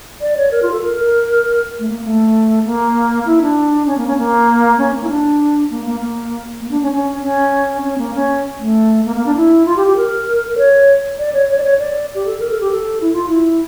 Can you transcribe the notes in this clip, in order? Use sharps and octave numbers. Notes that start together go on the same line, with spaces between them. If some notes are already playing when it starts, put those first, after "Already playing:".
D5
C#5
A#4
F4
A4
A#4
A#4
A3
A#3
A3
A#3
E4
D4
C#4
A#3
C#4
A#3
C#4
A#3
E4
D4
A#3
A#3
A#3
A#3
D4
C#4
C#4
C#4
C#4
A#3
C#4
A3
A#3
A#3
D4
E4
F4
G4
G4
A#4
A#4
C#5
D5
C#5
C#5
D5
C#5
D5
G4
A4
A#4
A4
G4
A4
E4
F4
E4